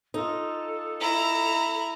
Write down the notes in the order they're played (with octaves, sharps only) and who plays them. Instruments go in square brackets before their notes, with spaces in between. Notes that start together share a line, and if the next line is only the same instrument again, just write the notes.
[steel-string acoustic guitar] D#4 F4 [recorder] A4
[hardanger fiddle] E4 [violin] A#5